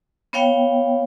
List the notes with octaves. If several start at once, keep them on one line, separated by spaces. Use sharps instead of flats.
B3 C#5 F5 G5